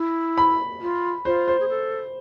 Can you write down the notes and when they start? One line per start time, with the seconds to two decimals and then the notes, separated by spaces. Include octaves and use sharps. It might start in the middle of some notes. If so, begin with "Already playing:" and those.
Already playing: E4
0.38 B5
0.81 F4
1.25 F4 C5
1.48 C5
1.60 G#4
1.69 A4